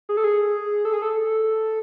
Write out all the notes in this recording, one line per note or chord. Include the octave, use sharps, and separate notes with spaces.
G#4
A4
G#4
A4
G#4
A4